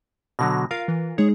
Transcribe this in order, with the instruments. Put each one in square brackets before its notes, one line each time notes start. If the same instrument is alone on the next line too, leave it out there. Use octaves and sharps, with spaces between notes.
[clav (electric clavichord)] B2 D3 F#3 [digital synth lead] A#6
[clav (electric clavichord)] F4 A#4 [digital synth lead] F5
[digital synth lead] E3
[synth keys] G#3 D#4 [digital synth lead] G#4 [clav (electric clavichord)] C#5